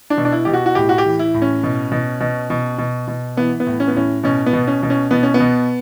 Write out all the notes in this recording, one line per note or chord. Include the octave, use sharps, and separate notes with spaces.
D4
B2
D4
E4
B2 G4
F#4
F#4
A2 G4
F#4
G4
E3
E4
A2
C#4
B2
B2
B2
B2
B2
B2
E3 B3
B3
A2
C#4
B3
A2 C#4
B2 C#4
B3
B2
C#4
B2
C#4
B2 B3
C#4
B3
B2